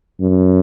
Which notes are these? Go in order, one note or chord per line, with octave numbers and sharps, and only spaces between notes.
F#2